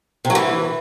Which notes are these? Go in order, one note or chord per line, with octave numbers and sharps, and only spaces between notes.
C3
F#3
E3